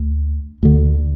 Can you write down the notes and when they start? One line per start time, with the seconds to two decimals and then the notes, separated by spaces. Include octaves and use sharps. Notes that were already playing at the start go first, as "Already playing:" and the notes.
Already playing: D2
0.63 D2 D3